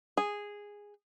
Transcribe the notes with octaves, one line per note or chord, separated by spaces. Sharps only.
G#4